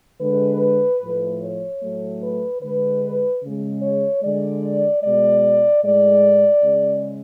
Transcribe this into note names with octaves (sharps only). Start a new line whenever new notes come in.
D3 G#3 B4
A2 F3 A3
C#5
A2 F#3 A3
B4
D3 G#3 B4
C#3 G#3
C#5
D3 G#3 D5
B2 G#3 D5
A2 G#3 D5
C#3 G#3